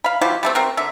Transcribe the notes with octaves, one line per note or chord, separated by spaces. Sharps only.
F5 B5
F3 E4 F#4 G4
G3 A3 C4
C4 F#4 A#4
D3 E5